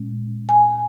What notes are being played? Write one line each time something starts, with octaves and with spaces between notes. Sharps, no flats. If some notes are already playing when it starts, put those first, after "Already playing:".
Already playing: A#2 G#3 C#4
G#5